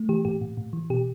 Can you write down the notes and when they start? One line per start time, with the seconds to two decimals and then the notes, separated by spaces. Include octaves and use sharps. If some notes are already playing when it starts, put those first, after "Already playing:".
Already playing: A3
0.09 E3 G4
0.25 A2 G4
0.41 A2
0.57 A2
0.73 E3
0.90 B2 G4